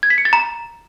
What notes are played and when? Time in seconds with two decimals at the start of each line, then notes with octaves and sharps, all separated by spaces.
0.03 G#6
0.10 B6
0.18 C#7
0.25 A6
0.33 A#5